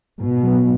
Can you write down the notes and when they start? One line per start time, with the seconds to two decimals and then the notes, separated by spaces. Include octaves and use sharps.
0.20 G#2 B2
0.43 F#3 B3